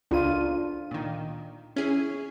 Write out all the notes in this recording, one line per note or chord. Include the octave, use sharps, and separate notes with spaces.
C#2 D4 F4 D#7
A#2 D#3
C#4 E4 G#4